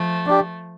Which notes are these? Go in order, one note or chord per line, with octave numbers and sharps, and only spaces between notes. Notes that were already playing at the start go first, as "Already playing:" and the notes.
Already playing: F3 A3
D4 G4